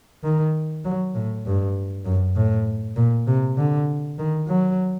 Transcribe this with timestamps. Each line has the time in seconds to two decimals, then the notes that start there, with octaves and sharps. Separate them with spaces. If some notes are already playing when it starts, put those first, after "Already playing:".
0.24 D#3
0.84 F#3
1.15 A2
1.46 G2
2.05 F#2
2.36 A2
2.96 A#2
3.27 C3
3.57 D3
4.18 D#3
4.47 F#3